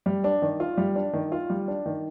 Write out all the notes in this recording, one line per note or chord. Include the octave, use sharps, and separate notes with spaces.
G3
D4
D#3
F4
G3
D4
D#3
F4
G3
D4
D#3